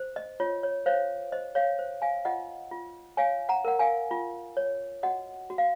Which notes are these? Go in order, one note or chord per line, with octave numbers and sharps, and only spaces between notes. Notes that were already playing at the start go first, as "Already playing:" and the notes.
Already playing: C5
D#5
F4 C#5
C#5
C5 C#5 F5
C5 D#5
C#5 F5
C5
F5 G#5
F4 D#5 F#5
F4
C#5 F5 G#5
F#5 A#5
A#4 F#5
F5 G#5
F4
C#5
F#4 D#5 F#5
F#4
F5